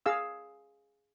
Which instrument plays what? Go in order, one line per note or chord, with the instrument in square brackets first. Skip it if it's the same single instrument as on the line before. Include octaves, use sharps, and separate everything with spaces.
[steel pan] G#4 F5 E6